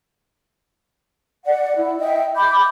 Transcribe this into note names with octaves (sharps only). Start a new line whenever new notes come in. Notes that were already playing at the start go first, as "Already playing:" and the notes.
D5 F#5
E4
D#5 E5 G5
B5 D6 G6